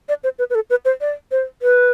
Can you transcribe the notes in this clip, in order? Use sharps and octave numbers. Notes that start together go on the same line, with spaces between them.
D5
C5
B4
B4
A4
B4
C5
D5
C5
B4